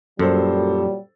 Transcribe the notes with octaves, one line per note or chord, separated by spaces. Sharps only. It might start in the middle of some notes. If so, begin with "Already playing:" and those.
F#2 A#2 F#3 G3 A4 C5